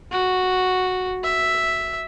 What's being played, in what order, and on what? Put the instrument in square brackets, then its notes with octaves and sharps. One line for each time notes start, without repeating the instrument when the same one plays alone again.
[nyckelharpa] F#4
E5